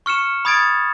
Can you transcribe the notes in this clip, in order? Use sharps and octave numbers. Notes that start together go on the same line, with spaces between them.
C#6 F6 C#7 E7
B5 D#6 G#6 A6 D7